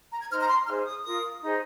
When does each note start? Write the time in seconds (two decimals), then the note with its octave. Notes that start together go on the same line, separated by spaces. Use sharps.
0.11 A#5
0.21 G#6
0.30 D#4 C5 F6
0.40 A#5
0.48 C6
0.67 D#4 G#4 C5 F6
0.86 D#6
1.04 F4 A#4 D#6
1.42 D#4 G#4 C5